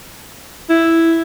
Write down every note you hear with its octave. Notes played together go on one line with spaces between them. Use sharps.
E4